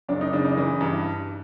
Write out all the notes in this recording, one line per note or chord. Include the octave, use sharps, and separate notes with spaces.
F#1 D4
D#4
C#3 D4
D#4
E3
G2